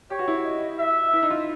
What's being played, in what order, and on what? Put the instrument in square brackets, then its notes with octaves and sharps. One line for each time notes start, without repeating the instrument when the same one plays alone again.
[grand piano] G4 [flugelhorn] C#5
[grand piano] F#4
E4
[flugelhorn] D#5
E5
[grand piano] E4
D#4
F4